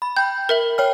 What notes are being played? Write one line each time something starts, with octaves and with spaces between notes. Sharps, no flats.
B5
G5 B5 G6
A#4 E5 F#7
C#5 G5 F6